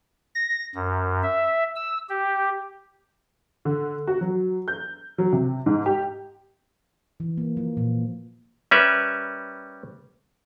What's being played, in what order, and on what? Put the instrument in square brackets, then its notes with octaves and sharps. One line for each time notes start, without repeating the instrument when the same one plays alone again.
[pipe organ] A#6
F#2
E5
E6
G4
[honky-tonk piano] D3
F#4
F#3
G6
F#3
C3
G#2
G4
[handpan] E3
A#3
F3
A#2
[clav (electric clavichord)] G3 C#4 A#4 B4 E5